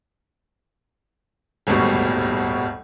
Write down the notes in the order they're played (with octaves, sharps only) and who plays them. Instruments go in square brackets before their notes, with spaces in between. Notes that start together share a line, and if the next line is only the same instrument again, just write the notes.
[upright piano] D#1 G#1 D2 B2 G3 C#6